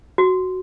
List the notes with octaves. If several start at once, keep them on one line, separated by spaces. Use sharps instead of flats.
F#4